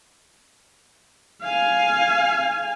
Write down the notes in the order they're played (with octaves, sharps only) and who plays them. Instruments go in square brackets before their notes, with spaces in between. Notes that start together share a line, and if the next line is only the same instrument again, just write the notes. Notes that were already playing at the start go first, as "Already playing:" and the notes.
[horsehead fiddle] F5 G#5